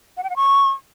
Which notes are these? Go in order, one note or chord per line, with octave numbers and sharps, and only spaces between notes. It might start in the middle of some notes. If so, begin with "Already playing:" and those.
F#5
G5
F#5
C#6